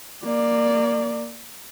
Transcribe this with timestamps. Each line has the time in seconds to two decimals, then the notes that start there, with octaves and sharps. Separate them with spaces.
0.24 A#3 D5